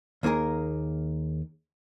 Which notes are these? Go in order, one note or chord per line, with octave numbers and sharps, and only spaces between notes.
D#2 A#3 D#4 G#4 A#4